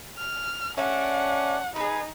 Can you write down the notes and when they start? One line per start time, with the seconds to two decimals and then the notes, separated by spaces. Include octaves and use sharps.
0.18 F6
0.78 A3 C#4 D4 F#5
1.76 D#4 G#4 B4